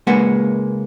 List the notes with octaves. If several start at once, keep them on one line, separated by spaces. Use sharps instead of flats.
C#2 G#3 A#3 B4 F#5 G#5